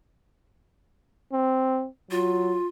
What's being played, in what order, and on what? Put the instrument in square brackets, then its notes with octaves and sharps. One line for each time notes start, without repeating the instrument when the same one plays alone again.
[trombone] C4
[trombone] F#3 [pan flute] F4